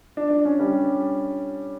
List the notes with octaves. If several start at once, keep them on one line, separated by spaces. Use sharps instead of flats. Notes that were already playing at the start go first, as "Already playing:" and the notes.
D4
D4
C#4
G3